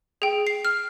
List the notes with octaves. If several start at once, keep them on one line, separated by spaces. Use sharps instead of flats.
G#4 G5
C7
F6